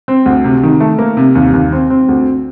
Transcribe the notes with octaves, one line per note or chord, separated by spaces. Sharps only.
C4
D2
C3
D#3
A3
A#3
C3
D#2
D#2
C4
C4
D2